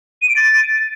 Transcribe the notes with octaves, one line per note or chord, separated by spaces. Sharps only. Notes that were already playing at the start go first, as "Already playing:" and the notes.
D#7
D7
A6